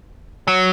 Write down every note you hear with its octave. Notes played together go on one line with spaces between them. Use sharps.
F#3